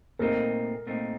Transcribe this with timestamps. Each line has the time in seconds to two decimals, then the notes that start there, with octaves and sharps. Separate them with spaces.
0.19 A#2 A3 C4 D#4 A#4
0.87 A#2 A3 C4 D#4